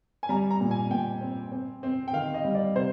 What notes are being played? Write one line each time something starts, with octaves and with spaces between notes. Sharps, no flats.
G#5
G3 A#5
A#5
A#2
G#5
A#2 G5
C4
C4
C4
G5
D#3 F5
D#5
G3
D5
C3 C5